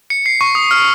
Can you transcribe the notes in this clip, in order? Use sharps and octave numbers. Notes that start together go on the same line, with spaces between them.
C#7
C7
C#6
D#6
F6